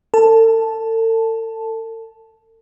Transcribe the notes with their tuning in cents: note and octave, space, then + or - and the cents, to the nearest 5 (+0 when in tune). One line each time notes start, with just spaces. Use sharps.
A4 +40 A5 -5